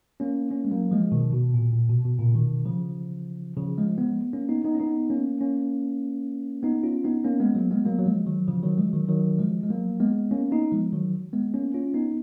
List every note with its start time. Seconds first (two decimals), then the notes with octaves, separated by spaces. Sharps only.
0.20 A#3 C#4
0.51 A#3 C#4
0.65 G#3
0.71 F#3 A#3
0.91 F3 G#3
1.12 B2 D#3
1.33 B2
1.54 A#2
1.73 A#2
1.90 B2
2.05 B2
2.19 A#2 C#3
2.35 B2 D#3
2.65 C#3 F3
3.57 C#3 F3
3.78 F3 G#3
3.98 G#3 B3
4.33 A#3 C#4
4.49 B3 D#4
4.65 B3 D#4
4.75 C#4
4.80 B3 D#4
5.10 A#3 C#4
5.41 A#3 C#4
6.63 B3 D#4
6.83 C#4 F4
7.04 B3 D#4
7.24 A#3 C#4
7.40 G#3 B3
7.55 F#3 A#3
7.71 G#3 B3
7.86 F#3 A#3
7.99 F#3
8.06 F3 G#3
8.26 D#3 F#3
8.48 C#3 F3
8.63 D#3 F#3
8.78 F3 G#3
8.93 D#3 F#3
9.08 D#3 F#3
9.39 F3 G#3
9.63 G#3
9.69 F#3 A#3
10.00 G#3 B3
10.31 A#3 C#4
10.51 B3 D#4
10.72 F3 G#3
10.93 D#3 F#3
11.33 G#3 B3
11.54 A#3 C#4
11.74 C#4 F4
11.94 B3 D#4